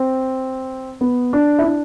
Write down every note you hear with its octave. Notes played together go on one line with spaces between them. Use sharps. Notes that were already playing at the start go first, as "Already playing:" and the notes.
Already playing: C4
B3
D4
E4
D4